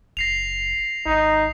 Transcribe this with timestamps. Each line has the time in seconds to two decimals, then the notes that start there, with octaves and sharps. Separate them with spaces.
0.17 F#1 A#6 C7 F7
1.06 G#1 D#4